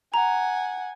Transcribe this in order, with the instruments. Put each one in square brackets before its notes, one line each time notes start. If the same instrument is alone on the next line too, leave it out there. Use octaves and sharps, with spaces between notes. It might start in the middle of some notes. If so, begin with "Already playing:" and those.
[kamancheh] F#5 G#5 [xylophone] A#5